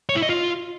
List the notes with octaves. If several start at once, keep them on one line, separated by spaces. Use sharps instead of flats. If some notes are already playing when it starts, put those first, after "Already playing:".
C#5
E4
D#5
F4